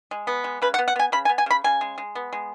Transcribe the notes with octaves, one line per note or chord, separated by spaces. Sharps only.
G#3
B3
G#3
C#3 B4
F#5
B3
F#5
B3 G#5
C#3 B5
G#5
B3
G#5
C#3 B5
C#3 G#5
G#3
G#3
B3
G#3